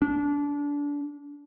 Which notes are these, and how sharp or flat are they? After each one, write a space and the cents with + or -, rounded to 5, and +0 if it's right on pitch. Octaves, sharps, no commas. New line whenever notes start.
D4 -25